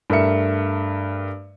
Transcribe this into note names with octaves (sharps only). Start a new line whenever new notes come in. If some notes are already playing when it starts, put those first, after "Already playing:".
G2 A3 A#4 E5 C#7